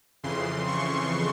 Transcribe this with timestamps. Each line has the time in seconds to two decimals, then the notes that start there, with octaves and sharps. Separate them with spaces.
0.23 F2 C#3 E3 C6
0.68 C#6